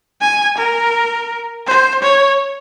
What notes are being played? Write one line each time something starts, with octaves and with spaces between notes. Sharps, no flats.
G#5
A#4
C5
C#5